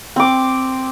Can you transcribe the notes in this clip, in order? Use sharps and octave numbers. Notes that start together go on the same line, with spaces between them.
C4 D6